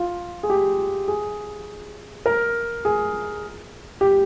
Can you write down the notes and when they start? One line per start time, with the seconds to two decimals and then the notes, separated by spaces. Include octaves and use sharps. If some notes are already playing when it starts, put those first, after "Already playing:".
Already playing: F4
0.43 G#4
0.50 G4
1.08 G#4
2.26 A#4
2.85 G#4
4.01 G4